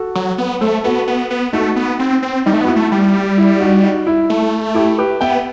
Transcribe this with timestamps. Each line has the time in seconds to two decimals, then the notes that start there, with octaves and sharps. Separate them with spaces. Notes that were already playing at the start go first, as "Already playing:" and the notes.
Already playing: F#4 A4
0.15 F#3
0.38 B3
0.61 A3 A4 C5
0.84 B3 F#4 A4
1.07 B3
1.30 B3
1.53 A3 D#4 F#4
1.76 B3
1.99 C4
2.22 C4
2.46 G3 D#4
2.53 A3
2.61 B3 F#4
2.68 E4
2.76 A3
2.92 G3
3.38 E4
3.60 D#4 F#4
3.83 D#4 F#4
4.07 E4
4.30 A3
4.75 E4 G4
4.98 G4 B4
5.21 B3 E5 G5